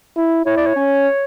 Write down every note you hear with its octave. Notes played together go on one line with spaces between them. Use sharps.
E4
E4 C#5
D5
C#5
C#4